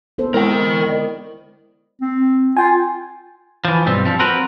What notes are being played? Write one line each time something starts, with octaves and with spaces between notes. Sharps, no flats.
B3 A4 C5
G#3 E4 A#4 G5
D5 D#5
C4
F4 G5 G#5
E3 F3
B1 G2 G3 C4
F3 G3
C4 F#4 A#4 B4